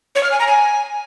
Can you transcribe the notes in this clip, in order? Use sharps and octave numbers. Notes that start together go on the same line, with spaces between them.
C#5
F6
G#5
A#5
G#5